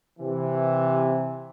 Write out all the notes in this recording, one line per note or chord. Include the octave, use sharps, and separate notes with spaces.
C3 E3